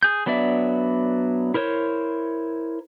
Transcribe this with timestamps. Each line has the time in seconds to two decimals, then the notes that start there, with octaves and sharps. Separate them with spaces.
0.03 G#4 G6
0.26 F#3 B3 D4 D5 E5
1.54 E4 A#4 C5 C#5